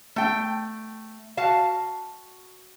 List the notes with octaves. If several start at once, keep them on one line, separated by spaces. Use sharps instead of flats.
A3 G5
F#4 F5 A5